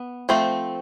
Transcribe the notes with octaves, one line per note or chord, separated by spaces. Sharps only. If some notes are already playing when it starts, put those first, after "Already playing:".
Already playing: B3
F3 A3 C4